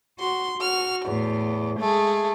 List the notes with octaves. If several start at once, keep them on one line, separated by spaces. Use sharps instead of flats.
F#4 C6
F#4 F6
E2 A2
G#3 A3 G#4